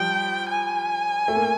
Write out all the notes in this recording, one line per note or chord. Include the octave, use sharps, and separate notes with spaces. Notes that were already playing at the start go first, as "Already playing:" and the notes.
Already playing: F3 G3 G5
G#5
A3
A#3